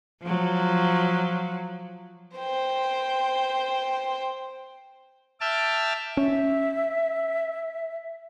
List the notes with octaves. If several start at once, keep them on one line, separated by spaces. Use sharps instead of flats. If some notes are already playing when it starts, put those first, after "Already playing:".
F3 F#3
C5 G5
E5 G5 A5 D6 E6 F6
C#4 E5